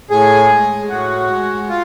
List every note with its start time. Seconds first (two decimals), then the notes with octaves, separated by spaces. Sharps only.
0.10 A2 G#4
0.50 G#3
0.89 A2 F#4
1.30 G#3
1.69 F4